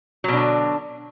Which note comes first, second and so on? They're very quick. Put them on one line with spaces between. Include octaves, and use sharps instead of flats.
F#3 B2 D4 D3